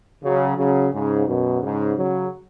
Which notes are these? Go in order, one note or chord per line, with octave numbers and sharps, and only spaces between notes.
C#3 F#3
C#3 F#3
G#2 C#3
F#2 B2
G#2 C#3
C#3 F#3